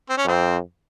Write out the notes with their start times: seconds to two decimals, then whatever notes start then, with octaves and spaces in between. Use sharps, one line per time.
0.09 C4
0.17 C#4
0.25 F2 C4